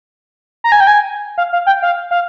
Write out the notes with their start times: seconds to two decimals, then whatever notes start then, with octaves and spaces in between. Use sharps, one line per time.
0.64 A#5
0.72 G#5
0.80 G5
0.87 G#5
1.38 F5
1.53 F5
1.66 G5
1.82 F5
2.11 F5